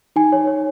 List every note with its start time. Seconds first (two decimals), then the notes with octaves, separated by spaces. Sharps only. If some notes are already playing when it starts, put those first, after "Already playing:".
0.16 D#4 G#5
0.32 C#5
0.47 C#5